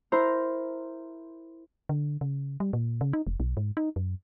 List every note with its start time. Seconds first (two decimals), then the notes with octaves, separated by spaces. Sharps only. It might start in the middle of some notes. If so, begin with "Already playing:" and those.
0.12 E4 A#4 C5 A#5
1.89 D3
2.21 C#3
2.60 G3
2.73 A#2
3.01 C#3
3.13 D#4
3.27 F1
3.40 B1
3.57 G#2
3.77 D#4
3.96 F#2